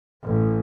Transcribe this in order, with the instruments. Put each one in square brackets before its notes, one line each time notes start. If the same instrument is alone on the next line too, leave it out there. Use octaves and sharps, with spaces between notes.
[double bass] A1